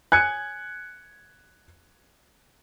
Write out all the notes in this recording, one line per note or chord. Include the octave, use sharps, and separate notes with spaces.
G#5 F#6 G#6 C#7